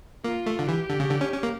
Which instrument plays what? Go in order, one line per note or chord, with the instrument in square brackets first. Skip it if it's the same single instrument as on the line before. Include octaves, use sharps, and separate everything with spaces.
[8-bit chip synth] A#3 [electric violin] F4
[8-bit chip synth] A3
D3
[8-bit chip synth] E3 [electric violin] G4
[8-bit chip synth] D3
C#3
D3
C#4
C#4
A#3